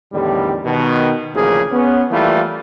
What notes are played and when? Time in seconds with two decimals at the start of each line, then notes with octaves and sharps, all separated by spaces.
0.13 E2 A2 D3 D#3 G3
0.65 B2 D#3
1.34 A1 D2 C#3 F3 A#3 G#4
1.72 B3 C#4
2.11 E3 G3 A3 A#3 E4 F4